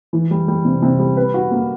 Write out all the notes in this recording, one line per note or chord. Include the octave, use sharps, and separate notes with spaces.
E3
G3
G3
C3
C3
G3
B4
F#4
A#3